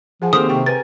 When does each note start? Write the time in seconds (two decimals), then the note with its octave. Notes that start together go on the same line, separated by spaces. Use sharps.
0.22 F3 G#4 F#5 G#5
0.33 D#3 A#3 C4 G4 A4 C5 D#6
0.49 C3 G4 G5 C#6
0.66 A#4 B4 G#5 A6